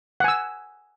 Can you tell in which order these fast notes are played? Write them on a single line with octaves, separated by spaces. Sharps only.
F#5 G#5 E6